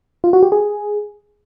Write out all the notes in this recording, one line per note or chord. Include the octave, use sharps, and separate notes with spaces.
F4
F#4
G4
G#4